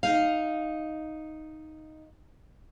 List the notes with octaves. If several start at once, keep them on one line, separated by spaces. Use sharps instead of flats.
D#4 F5